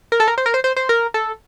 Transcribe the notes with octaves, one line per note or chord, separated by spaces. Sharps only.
A#4
A4
A#4
C5
A#4
C5
C5
C5
A#4
A4